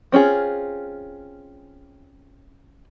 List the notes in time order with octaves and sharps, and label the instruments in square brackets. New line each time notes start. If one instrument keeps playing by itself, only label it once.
[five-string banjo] C4 C#4 F4 G#4